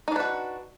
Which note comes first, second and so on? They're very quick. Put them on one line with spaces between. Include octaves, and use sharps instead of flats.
D#4 D4 B4 F#4